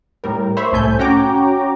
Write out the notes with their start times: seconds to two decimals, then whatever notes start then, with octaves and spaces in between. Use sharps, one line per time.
0.24 A2 G3 A#4
0.57 C5 C#5 E5 B5
0.72 C2 A2 A3 G#5 G6
0.99 C#4 F#4 C#5 G5 A#5 D6